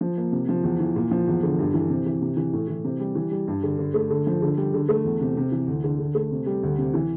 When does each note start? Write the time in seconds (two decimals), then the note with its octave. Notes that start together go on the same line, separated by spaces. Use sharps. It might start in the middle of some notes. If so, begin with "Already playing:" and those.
0.01 F3
0.17 A#3
0.32 C3
0.49 F3
0.64 E2
0.80 E3
0.96 A#2
1.11 F3
1.27 E2
1.43 D3
1.59 G2
1.74 E3
1.90 C3
2.06 E3
2.22 C3
2.37 E3
2.53 A2
2.68 E3
2.84 C3
3.00 G3
3.15 E3
3.31 G3
3.48 G2
3.63 D3
3.79 D3
3.94 A3
4.10 D3
4.27 F3
4.42 D3
4.57 G3
4.74 D3
4.89 A3
5.05 E2
5.21 C3
5.37 C3
5.52 E3
5.67 D2
5.84 D3
5.99 D3
6.15 A3
6.32 C3
6.46 G3
6.63 D2
6.79 C3
6.94 E3